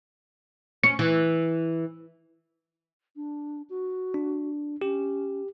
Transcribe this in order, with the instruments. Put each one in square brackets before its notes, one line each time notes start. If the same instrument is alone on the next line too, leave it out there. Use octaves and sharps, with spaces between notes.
[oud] C#4 [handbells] C#7
[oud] E3
[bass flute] D4
F#4
[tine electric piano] D4
[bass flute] C#4 [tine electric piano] G4